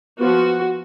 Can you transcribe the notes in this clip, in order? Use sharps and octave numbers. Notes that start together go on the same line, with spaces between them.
F3 B3 F#4